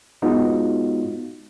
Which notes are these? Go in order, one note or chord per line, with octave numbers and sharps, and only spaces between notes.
G#3 B3 D#4 F4 F#4